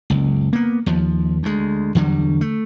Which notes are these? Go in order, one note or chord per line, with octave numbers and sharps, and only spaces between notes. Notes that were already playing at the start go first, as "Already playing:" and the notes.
F#1 C#2
A#3 B3
D#2 F3
D2 G#3
E2 D3 F#3 G3
A3